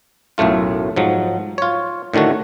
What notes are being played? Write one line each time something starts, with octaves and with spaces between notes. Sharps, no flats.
B1 F#2 A2 A3 F4
G#2 F3 F#3
F4 C#5
A2 D3 D#3 A3 F#4